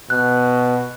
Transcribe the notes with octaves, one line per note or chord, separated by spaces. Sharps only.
B2 F#6